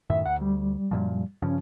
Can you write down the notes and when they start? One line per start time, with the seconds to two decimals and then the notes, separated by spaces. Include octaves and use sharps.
0.10 F#2 A2 D#3 E5
0.26 D2 F#5
0.41 G3
0.91 F#2 A#2 F3
1.42 G2 C#3 F3 C#4